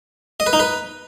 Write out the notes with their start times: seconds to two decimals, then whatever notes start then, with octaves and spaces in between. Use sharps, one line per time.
0.40 D#5
0.46 B4
0.53 D#4
0.60 B4